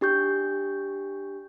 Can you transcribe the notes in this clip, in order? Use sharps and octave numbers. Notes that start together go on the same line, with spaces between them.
D4 G4 C#6 G6